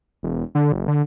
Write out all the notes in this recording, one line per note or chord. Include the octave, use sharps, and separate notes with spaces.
E1
D3
F#1
D3